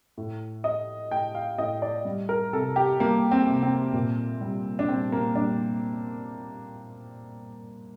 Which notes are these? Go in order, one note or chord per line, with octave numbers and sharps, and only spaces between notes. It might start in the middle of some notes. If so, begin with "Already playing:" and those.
A2
A3 D#5
A2 G5
F5
A2 D#5
D5
G3
A#4
C3 A4
G4
G3 A#3
C4
C3
C4
A#2
G3
D4
G3 C4
A#3
G3 D4